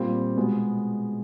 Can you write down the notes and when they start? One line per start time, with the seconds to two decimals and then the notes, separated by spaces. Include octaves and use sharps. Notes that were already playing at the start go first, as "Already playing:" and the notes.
Already playing: A#2 G3 C4 F4
0.36 B2 G#3 B3